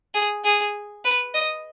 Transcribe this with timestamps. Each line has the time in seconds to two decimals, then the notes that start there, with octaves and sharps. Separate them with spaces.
0.14 G#4
0.45 G#4
1.05 B4
1.34 D#5